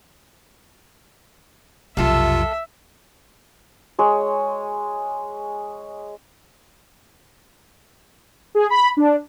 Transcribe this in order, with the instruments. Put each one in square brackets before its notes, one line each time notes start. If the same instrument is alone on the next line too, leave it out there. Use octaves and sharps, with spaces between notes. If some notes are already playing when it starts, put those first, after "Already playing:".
[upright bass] B1 F2 [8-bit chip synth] C3 F4 [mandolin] A4 F5 [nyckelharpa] E5
[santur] G#3 C#5
[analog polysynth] G#4
B5
D4